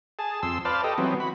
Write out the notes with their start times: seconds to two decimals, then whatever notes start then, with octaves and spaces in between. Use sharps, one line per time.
0.19 G#4 A5
0.43 F2 C6 E6
0.65 B4 C5 D5 F5 A5
0.84 G4 A4 D#5
0.98 E3 F#3 B3 C4
1.20 F#4 B5